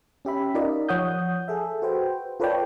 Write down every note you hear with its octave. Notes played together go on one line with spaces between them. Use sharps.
C#4 G4 E5 B5
D#4 F4 A#4 D5 D#5
F3 C#5 F#5 D#6 G6
G#4 A4 E5
F#4 B4 C5 G5
F4 A4 B4 C#5 D5 G5